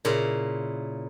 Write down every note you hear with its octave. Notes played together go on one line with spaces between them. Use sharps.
A#2 C#3 E4 A#5